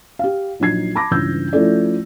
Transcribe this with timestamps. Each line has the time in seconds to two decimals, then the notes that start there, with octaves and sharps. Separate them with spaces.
0.19 G4 F5
0.60 A#1 F#3 D#4 G#6 C7
0.95 A5 B5 D6 A#6
1.11 C#2 G2 E3 C#4 E6 G6
1.53 F3 A3 C#4 E4 A4 D5